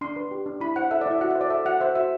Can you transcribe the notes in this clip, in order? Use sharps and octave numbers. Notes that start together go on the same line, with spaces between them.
D4 C6
B4
G4
D4
E4 B5
C5 F#5
A4 E5
D5
E4
E5
F#4 F#5
E5
C5
D5
A4 E5
F#4 F#5
C5 E5
F#4 E5